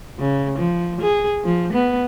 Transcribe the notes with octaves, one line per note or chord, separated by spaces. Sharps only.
C#3
F3
G#4
F3
B3